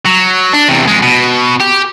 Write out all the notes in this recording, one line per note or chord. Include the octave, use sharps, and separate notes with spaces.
F#3
D4
E2 C3
F2 G#3
B2
G4